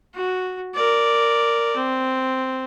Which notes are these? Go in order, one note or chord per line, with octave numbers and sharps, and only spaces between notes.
F#4
A#4 D5
C4